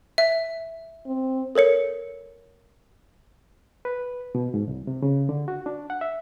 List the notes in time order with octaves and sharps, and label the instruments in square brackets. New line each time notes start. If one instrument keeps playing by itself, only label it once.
[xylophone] E5
[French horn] C4
[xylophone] A4 A#4 C#5 C#7
[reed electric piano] B4
B2
G#2
C2
C3
C#3
D3
F#4
D4
F#5
E5